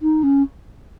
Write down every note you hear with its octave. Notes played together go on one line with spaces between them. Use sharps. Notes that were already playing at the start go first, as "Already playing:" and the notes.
D#4
C#4